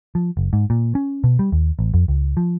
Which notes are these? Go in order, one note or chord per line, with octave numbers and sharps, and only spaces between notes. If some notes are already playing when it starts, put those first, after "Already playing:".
F3
F#1
G#2
A#2
C#4
B2
G3
D#2
A1
F2
C#2
F3